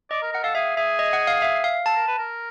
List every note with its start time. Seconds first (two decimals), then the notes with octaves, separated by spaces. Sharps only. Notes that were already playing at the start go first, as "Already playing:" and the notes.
0.11 D5 D#5
0.22 A#4
0.33 A#4 F#5
0.43 A4 F5
0.55 G#4 E5
0.77 G#4 E5
0.99 D#5
1.13 F#5
1.27 F5
1.42 E5
1.64 F5
1.85 A4 A5
1.96 A#4
2.07 B4
2.19 A#4